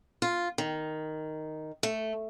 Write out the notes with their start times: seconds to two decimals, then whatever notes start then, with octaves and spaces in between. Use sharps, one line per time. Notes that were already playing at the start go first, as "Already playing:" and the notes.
0.22 F4
0.58 D#3
1.83 A3